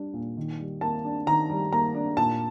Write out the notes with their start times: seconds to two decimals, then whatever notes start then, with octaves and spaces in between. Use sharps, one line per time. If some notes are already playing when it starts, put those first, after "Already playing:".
Already playing: G3 D4
0.14 A#2
0.37 D#3
0.59 G3
0.81 A#3 A5
1.05 D4
1.27 D#3 A#5
1.50 G3
1.72 A#3 A#5
1.95 D4
2.17 A#2 A5